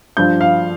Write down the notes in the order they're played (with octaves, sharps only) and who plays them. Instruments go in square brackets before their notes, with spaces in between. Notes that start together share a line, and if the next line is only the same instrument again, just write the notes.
[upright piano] G2 F3 G6
F5